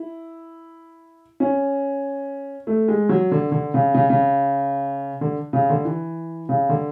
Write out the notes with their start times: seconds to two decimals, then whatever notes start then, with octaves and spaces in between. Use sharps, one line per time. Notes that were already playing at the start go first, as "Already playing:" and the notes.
Already playing: E4
1.40 C#4
2.67 A3
2.88 G#3
3.09 F#3
3.31 D3
3.52 D3
3.74 C#3
3.94 C#3
4.10 C#3
5.21 D3
5.53 C#3
5.70 D3
5.85 E3
6.49 C#3
6.69 D3